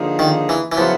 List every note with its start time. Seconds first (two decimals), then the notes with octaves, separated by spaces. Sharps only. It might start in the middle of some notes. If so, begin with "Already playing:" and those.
Already playing: D3 F3 A#3 D#4 G#4
0.19 D#3
0.49 E3
0.72 E3
0.77 C#3 F3 F#3 B3 E4